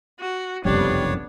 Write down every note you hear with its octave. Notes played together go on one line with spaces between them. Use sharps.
F#4
F#1 C2 F2 G3 B3 D4 C#5